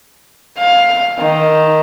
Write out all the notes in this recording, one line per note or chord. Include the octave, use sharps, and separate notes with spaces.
F5
D#3